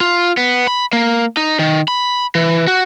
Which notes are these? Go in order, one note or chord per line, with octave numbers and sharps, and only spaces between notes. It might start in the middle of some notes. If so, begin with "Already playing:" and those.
F4
B3
B5
A#3
D#4
D#3
B5
E3
F#4